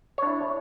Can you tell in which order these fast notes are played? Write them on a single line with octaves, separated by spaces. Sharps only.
C#5 D4 E4